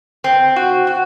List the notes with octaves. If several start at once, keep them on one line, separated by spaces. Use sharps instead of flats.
C4
F#4
F#4